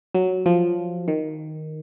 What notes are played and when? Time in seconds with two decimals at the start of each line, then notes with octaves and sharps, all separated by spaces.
0.15 F#3
0.46 F3
1.08 D#3